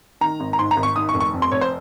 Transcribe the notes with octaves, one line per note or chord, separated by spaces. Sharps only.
D#3 A#5
G#1
A#5
G#2 C6
A#5
G#1
C#6
D#3 D#6
C#6
F1
C#6
F2
C6
F1 C#5
C5